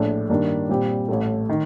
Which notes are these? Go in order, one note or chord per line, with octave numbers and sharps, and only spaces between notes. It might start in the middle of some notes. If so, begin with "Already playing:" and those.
Already playing: A#1 A2 A3 D4
G2 D#3 A#3 D4
A#2 G3 C4 G4
A1 A2 A3
D#3